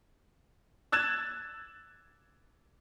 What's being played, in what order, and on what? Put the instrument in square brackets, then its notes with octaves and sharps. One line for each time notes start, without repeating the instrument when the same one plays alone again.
[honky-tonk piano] E6 F#6 G#6 A6 E7